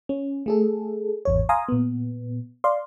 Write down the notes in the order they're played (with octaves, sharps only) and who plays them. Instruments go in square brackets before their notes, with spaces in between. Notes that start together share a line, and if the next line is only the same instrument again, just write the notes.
[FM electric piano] C#4
A3 G#4 A4
G#1 E2 C#5
F5 G#5 A#5 C6 D#6
A#2 B3
D5 F5 C6